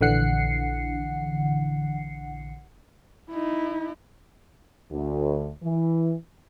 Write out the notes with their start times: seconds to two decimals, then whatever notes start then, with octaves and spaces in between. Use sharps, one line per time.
0.01 A#1 D3 E3 F#5 C7 C#7
3.30 D#4 E4
4.92 D2
5.63 E3